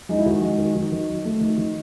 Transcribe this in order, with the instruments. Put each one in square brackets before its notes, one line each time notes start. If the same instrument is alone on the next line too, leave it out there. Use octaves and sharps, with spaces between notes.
[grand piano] G#3 D#4
E4
D#3 F#4
G#3
D#3
D#3
D#3
F#3
A3
D#3
D#3